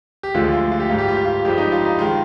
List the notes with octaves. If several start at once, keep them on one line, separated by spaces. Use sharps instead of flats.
G4
D2 D3 F3 G#3 F4
F4
F4
G4
G#2 G3 F4
G4
F4
G4
F4
G2 F3 G#3 G4
D#4
F4
D#4
D#3 G#3 F4